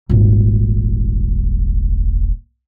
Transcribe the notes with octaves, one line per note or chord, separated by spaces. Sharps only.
D#1 G#1